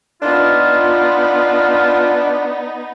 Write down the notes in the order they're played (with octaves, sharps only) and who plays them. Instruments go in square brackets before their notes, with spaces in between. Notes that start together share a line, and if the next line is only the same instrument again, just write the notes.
[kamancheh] B3 D#4 [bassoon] D4 [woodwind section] F4